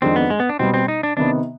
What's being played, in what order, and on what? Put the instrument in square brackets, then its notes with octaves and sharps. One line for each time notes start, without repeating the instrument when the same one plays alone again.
[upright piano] F2 D#3 G#3 D4 [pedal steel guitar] C4
[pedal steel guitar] B3
G#3
B3
D4
[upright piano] B2 G3 B3 [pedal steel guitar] C4
[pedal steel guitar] C4
D#4
D4
[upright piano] C3 D#3 B3 [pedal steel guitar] D4